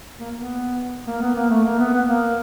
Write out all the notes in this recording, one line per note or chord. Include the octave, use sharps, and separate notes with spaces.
A#3
B3
A#3
B3
A#3
A3
A#3
B3
B3
A#3